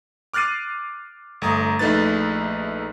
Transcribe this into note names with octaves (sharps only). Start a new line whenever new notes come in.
D6 F6 F#6 A6 C7 D#7
G1 A3 A#5 D#6
A#1 A3 D#4 B4 A6